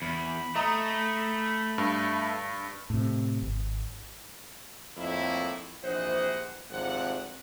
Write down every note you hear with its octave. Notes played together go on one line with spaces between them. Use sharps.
E2 B5
A3 D#5 A#5
G2
A2 C3
G#1
F2 A2 D#3 A#3 E4
A#1 C3 E3 C5 D#5 F#5
G#1 D2 C3 F3 F#5